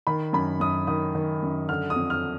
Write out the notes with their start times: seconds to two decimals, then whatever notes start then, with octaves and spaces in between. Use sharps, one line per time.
0.07 D#3 B5
0.33 F#2 B5
0.60 F#2 D#6
0.87 D#3 D#6
1.15 D#3
1.43 F#2
1.69 D3 F6
1.90 D#6
1.96 F2
2.10 F6